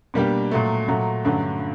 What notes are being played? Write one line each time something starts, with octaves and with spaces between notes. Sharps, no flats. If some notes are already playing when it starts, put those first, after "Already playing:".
B2 G3 A#3 D4 G4
A#2 F#3 A3
A#2 F#3 A3
G2 D3 F#3 A3 C#4